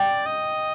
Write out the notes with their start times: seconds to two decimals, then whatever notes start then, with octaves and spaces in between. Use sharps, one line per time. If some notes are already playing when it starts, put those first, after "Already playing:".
Already playing: D5 G5
0.26 D#5